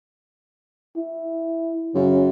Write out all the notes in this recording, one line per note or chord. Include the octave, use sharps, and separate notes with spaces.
E4
F#2 C#3